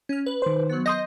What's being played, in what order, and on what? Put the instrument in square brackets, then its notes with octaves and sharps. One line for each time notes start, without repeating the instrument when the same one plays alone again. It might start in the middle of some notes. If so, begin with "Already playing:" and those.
[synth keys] C#4 F6
B4
[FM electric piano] D#3 C5
[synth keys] F#3 B3
[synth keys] D#5 G6 [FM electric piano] C6 D#6 A#6